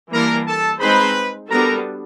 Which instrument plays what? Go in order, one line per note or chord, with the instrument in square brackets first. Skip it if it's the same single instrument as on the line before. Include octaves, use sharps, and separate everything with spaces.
[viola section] E3 G3 A#3 D4 [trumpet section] A#4 A#5
[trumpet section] A4 A5
[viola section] G#3 C4 D#4 G#4 C5 [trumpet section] B4 B5
[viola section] G3 B3 D4 F#4 A4 [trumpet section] A#4 A#5